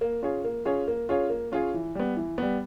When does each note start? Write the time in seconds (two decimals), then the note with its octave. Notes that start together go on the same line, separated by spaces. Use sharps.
0.01 A#3
0.22 C#4 F4 G#4 C#5
0.44 A#3
0.65 C#4 F4 G#4 C#5
0.88 A#3
1.09 C#4 F4 G#4 C#5
1.30 A#3
1.52 C#4 F4 G#4 C#5
1.74 E3
1.95 G3 B3
2.16 E3
2.38 G3 B3